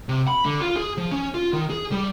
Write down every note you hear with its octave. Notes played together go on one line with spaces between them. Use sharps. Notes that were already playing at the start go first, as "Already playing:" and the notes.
C3
B5
D3
F4
G#4
F3
C#4
F4
D#3
G#4
G3